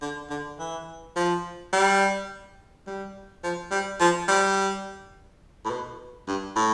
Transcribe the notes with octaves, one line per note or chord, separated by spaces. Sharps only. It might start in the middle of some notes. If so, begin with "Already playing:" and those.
D3
D3
E3
F3
G3
G3
F3
G3
F3
G3
A2
B2
G2
A2